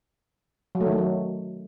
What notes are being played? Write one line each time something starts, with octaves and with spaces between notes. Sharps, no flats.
F#3
A3
D#3
A3
F#3